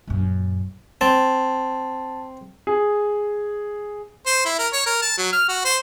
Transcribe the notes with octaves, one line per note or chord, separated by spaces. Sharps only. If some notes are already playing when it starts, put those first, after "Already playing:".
A#1 F#2
C4 A5
G#4
C5
E4
A#4
C#5
A#4
A5
F#3
F6
F#4
C5